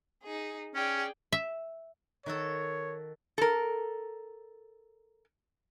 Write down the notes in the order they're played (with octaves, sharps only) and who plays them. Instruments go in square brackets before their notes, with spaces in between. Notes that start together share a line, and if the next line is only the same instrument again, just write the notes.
[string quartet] D#4 G#4
[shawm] C#4 [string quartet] G#4 D5 G5
[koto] E5
[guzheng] D#3 F#4 A4 [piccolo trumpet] C#5
[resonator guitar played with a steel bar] A4 A#4